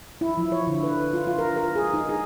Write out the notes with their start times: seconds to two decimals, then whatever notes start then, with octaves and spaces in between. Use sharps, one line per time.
0.21 E4
0.37 F3
0.52 C#5
0.67 D3
0.83 B4
1.13 F4
1.27 F4
1.39 A#4
1.56 A#4
1.75 G#4
1.94 D#4
2.09 G#4